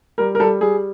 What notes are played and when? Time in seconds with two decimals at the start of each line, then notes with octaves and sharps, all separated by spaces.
0.18 G3 A#4
0.35 A#4
0.40 G3 A4
0.61 G3 G#4